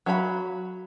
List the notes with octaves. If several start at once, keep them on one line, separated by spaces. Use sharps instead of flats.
F#3 F5 A#5 B5